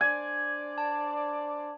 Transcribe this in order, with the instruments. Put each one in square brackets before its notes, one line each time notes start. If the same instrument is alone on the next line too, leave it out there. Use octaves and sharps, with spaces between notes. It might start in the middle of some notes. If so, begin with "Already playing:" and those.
[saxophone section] D4 C5 D5 [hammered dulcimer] G#5
[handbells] A5